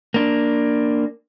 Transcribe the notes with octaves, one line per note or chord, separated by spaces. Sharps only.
A#3 D4